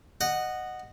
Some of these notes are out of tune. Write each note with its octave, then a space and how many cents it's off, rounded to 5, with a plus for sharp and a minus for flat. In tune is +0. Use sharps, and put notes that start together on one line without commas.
D#5 -15 F#5 +0